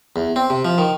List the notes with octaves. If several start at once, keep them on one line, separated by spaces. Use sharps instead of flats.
E2
C4
C3
F3
D#3